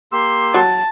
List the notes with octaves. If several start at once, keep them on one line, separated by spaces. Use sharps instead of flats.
A#3 G4 C6 E6
F#3 A5